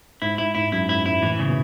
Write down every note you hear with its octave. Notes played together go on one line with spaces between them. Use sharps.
G#2 E4
G#2 E4
G#2 E4
F#2 E4
G#2 E4
G#2 E4
A2 E3
C#3
B2